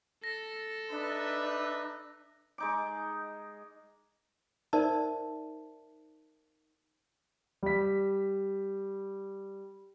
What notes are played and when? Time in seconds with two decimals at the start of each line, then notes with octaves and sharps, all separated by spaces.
0.24 A4 A#6
0.90 D4 D#4 B4 E5
2.58 G#3 D#4 D6
4.73 D#4 A#4 C5 D5 E5 A5
7.63 G3 B6